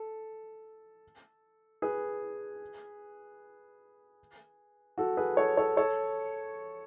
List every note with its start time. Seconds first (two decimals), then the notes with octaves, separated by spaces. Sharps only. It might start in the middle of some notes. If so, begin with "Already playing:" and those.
Already playing: A4
1.82 G#4 B4
4.98 F#4 A4
5.17 G#4 B4
5.37 A4 C#5
5.57 A4 C#5
5.77 A4 C#5